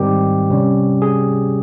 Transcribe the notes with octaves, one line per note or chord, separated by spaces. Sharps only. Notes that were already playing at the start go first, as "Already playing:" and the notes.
Already playing: G#2 D#3 G3 C4 G4
C3 G3 C#4
G#4